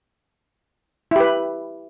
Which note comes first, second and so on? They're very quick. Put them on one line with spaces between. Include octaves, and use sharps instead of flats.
E4 G4 B4